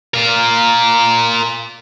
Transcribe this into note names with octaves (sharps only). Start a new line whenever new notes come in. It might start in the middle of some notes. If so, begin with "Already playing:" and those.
F4 A#4